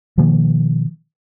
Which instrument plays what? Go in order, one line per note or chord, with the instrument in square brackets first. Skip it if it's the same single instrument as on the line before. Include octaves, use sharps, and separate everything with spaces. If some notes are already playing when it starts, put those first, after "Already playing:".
[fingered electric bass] B2 D#3 F3 A#3